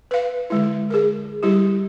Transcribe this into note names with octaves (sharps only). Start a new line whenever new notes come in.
B4 F5
D3 G#3 E4
G#4 A#4
G3 E4 G4